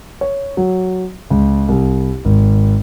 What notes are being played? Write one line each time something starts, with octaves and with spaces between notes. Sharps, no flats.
C#5
F#3
C#2
C2
G#1